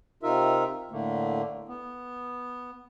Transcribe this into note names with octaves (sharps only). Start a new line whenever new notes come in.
C3 D#4 F4 A#4 E5
A2 D3 A3 A#3
B3